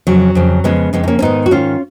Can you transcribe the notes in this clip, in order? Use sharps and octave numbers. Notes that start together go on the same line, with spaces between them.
F2 C#3 F#3
F2 C#3
F2 C#3 G#3 B3
F2 C#3 G#3 B3
D#4
A#3 C#4
C#4
G#2 D#3 B3 D#4
F#4
G#2 D#3 C#4 F4